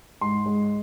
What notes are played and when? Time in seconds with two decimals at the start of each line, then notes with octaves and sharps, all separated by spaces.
0.21 G#2 C6
0.46 G#3